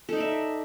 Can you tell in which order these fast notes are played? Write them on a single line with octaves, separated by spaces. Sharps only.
A4 D#4 D5 E5